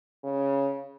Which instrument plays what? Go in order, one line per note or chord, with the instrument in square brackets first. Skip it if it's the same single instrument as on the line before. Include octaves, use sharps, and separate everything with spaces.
[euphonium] C#3